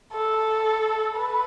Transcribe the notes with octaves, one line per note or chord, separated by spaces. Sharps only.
A4
B4